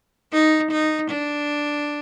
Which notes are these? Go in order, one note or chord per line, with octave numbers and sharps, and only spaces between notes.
D#4
D#4
D4